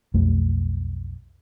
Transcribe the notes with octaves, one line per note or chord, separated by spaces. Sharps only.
B1 F2 G3 A3